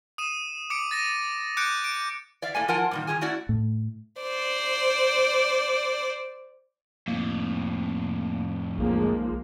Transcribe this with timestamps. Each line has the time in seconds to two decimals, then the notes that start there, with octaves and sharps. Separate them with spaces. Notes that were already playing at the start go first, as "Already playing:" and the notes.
0.18 D#6 D#7 E7
0.70 D6 C#7 D7
0.91 A6 A#6 D#7
1.57 D6 F#6 G6 C#7 D7
1.84 D7
2.42 D5 E5 F5
2.55 A2 A3 A#3 G#5
2.68 F3 F4 A#4 F#5 G#5 A5
2.91 G2 A#2 D#3
3.07 D#3 F#3 F4 G#4 G#5
3.21 A3 C#4 E4 F#4 D5 F#5
3.49 A2
4.21 C5 D5
7.08 F2 A2 A#3
8.78 B1 F3 G#3 A#3